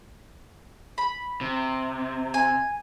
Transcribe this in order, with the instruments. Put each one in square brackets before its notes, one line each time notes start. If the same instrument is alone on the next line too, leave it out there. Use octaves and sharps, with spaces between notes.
[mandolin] B5
[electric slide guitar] C3
[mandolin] G#5